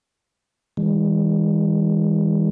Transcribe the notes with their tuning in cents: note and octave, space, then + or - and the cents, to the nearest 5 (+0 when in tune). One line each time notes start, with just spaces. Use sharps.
E3 -45 G#3 -45